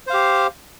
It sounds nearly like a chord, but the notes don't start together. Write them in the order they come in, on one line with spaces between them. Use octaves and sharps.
C5 F5 G4